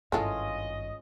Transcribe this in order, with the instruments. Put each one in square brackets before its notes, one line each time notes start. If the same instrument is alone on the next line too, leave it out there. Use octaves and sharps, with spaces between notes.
[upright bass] G#1 G2 [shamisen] E3 A4 [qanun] G#3 C#4 F4 [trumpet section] D#5